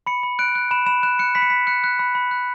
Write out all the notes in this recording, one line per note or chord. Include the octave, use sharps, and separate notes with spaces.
B5 C#7
B5
F#6 D7
F#6
B5 E7
B5 E7
F#6 E7
F#6 C#7
B5 B6
C#7
B5 B6
F#6 C#7
F#6
B5
B5
F#6